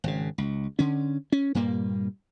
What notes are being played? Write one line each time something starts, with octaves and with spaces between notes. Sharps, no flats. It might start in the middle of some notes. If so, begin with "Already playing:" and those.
G#1 C#3
C#2
D3 C#4
C#4
G2 A#2 G3 A#3